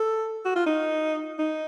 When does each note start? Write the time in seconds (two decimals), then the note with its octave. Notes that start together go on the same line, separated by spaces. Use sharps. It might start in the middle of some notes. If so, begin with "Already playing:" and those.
Already playing: A4
0.45 F#4
0.56 F4
0.66 D#4
1.39 D#4